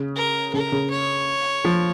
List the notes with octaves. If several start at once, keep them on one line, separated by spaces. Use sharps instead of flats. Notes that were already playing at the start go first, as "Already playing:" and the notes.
Already playing: C#3
A#4
C#3 A#4
C#3
C#5
F3